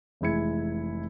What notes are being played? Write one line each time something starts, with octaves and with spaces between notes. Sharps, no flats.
F1 E3 G#3 E4 G#6 C#7